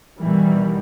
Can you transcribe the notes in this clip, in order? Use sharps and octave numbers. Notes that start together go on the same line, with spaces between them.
B2 D#3 E3 G3